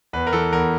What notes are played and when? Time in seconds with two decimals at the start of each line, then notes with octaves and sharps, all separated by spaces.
0.13 E2 B4
0.27 A#4
0.33 E3 A4
0.53 E2 A#4